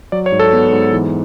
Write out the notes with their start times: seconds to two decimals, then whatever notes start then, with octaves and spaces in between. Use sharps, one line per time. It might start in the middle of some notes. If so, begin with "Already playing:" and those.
0.12 F#3 D5
0.26 C#5
0.32 G#2
0.40 A4
0.53 B3
0.72 G#2
0.92 E3